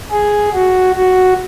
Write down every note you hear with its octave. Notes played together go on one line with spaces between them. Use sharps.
G#4
F#4
F#4